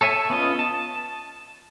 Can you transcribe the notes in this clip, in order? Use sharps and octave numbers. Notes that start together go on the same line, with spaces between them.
A4 C#5 E5 G#5
B3 C#4 F4 D#5
A5